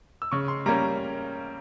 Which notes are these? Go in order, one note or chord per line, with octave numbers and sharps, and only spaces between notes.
E6
C#3 C#6
C6
G3 A#3 C#4 A#5